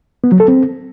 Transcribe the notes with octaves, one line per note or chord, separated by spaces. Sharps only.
B3
F#3
A4
C4